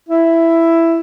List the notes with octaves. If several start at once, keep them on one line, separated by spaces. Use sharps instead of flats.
E4